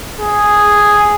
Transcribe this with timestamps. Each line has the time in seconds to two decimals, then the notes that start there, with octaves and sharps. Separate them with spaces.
0.19 G#4